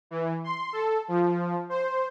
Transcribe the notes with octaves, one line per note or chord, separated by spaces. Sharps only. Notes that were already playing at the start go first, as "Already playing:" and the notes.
E3
C6
A4
F3
C5